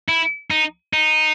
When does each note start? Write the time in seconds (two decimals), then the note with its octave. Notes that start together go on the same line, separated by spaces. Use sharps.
0.09 E4
0.51 D#4
0.93 D#4